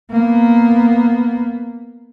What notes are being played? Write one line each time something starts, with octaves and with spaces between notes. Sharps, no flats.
A#3 B3